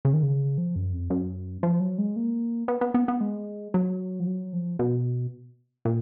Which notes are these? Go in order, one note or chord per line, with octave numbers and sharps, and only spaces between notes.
C#3
D#3
C#3
F3
F#2
F2
F#2
F3
F#3
G#3
A#3
B3
B3
B3
B3
G#3
F#3
F3
F#3
F3
B2
A#2